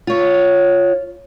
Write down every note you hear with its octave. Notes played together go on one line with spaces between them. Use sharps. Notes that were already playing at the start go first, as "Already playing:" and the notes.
F4 C#5